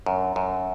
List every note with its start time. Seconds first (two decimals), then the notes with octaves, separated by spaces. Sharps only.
0.06 F#2
0.36 F#2